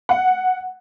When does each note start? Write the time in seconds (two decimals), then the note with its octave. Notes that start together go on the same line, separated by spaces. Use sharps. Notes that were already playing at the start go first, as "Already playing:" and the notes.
0.09 F#5